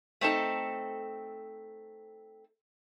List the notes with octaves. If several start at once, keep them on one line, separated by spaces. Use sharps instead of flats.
A3 C4 D#4 A4